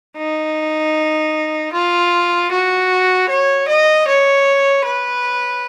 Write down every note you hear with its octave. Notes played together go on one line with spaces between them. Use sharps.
D#4
F4
F#4
C#5
D#5
C#5
B4